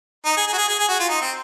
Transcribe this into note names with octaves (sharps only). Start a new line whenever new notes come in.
D#4
G#4
G#4
F#4
G#4
G#4
G#4
F#4
F4
D#4
C4